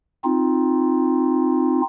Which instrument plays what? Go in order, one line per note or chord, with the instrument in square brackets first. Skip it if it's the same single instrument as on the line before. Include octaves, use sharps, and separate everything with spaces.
[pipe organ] C4 D#4 F4